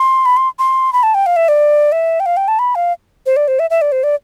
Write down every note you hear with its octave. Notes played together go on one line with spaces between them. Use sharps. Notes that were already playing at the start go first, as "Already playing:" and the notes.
Already playing: C6
B5
C6
C6
B5
A5
G5
F5
E5
D5
E5
G5
F5
G5
A5
B5
F5
C5
D5
C5
E5
E5
D5
C5
D5